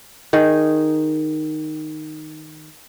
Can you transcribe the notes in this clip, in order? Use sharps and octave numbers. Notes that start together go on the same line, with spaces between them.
D#3 D#4 G#4